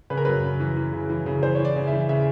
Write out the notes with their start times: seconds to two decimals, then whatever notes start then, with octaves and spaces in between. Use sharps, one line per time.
0.10 C#3 B4
0.17 A#4
0.25 F#2 B4
0.43 C#3
0.60 E3
0.77 E3
0.93 C#3
1.10 E3
1.26 C#3
1.43 E3 C5
1.55 E3 C#5
1.65 D5
1.76 C#3
1.87 E5
1.92 E3
2.09 C#3 E5